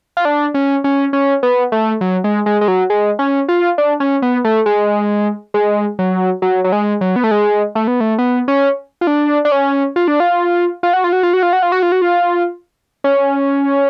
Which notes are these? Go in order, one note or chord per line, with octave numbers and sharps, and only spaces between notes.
F4
D4
C#4
C#4
C#4
B3
A3
F#3
G#3
G#3
G#3
F#3
G#3
C#4
F4
D4
C#4
B3
A3
G#3
G#3
F#3
F#3
F#3
G#3
F#3
B3
A3
G#3
A3
B3
A3
B3
C#4
F4
D4
D4
C#4
F4
D4
F4
F4
F#4
F4
F#4
F4
F#4
F4
F#4
F4
F#4
F4
F#4
F4
C#4